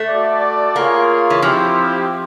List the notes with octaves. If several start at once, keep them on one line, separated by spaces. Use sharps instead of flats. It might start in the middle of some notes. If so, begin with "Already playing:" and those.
Already playing: A3
F#4 A4 D5
A#3 F4 G#4 C#5
E3
F3 C4 E4 G4